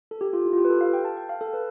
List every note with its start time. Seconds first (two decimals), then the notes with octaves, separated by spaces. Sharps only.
0.11 A4
0.21 G4
0.33 F4
0.45 E4
0.53 F4
0.58 G4
0.65 B4
0.70 A4
0.81 F5
0.93 G5
1.05 A5
1.17 G5
1.29 F5
1.41 A4
1.53 B4